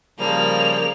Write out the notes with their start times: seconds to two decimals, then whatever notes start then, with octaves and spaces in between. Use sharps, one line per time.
0.19 C#3 F3 G3 A#3 F7